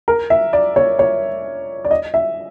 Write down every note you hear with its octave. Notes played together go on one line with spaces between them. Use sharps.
A#4
E5
D5
C#5
C#5
D5
D#5
E5